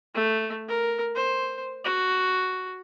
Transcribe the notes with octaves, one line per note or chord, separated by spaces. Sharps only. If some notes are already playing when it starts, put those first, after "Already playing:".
A3
A#4
C5
F#4